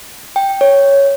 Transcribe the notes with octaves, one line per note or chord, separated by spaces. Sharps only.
G5
C#5